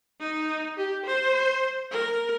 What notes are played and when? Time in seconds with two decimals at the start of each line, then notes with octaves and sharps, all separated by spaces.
0.20 D#4
0.77 G4
1.06 C5
1.91 A#4